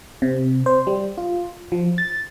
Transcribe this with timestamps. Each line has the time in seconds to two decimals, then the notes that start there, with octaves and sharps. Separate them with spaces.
0.22 C3
0.66 C5
0.87 G3
1.18 F4
1.72 F3
1.98 A6